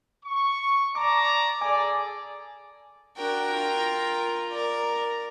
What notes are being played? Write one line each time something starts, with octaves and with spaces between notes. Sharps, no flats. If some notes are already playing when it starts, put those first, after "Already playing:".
C#6
D5 A5 A#5 D6
G#4 A4 D5 G#5 D6
D4 F#4 A#4 G5
F4 A#5
A#4 D5 A#5